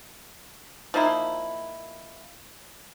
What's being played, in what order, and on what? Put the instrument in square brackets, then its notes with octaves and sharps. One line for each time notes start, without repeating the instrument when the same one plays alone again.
[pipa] F3 A#3 D#4 E4